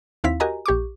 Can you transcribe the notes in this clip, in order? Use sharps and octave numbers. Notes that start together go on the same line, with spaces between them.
D#2 C4 E4 F5 B6
F#4 G4 A#4 D#5 G#5 A#5
A#1 G4 C#6 D6